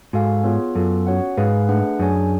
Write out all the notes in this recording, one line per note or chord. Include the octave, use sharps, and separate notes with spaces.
G#2 F#4 A4 F5 G#5
B3 F4 G#4 C#5
F#2 B3 F4 A4
C#4 F#4 C#5 F#5
G#2 G#4 B4 F5
A3 D4 G#4 B4 F#5
F#2 D4 G#4 C#5 G#5